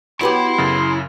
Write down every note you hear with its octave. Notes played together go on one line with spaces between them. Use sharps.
F#3 B3 E4 G4 B5 C6
F#2 C#3 A6